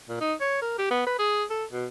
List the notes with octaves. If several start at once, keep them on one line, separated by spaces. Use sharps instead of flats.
A#2
D#4
C#5
A#4
G4
B3
B4
G#4
A4
B2